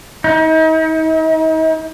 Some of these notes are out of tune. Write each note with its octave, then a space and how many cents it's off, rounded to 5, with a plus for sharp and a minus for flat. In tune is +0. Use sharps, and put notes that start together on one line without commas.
D#4 +40